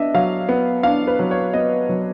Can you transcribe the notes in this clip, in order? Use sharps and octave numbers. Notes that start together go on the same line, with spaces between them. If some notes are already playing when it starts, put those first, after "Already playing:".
Already playing: B3 D4 D#5 E5
F#3 F5
B3
D4 F5
B4
F#3
C#5
B3 D#5
F#3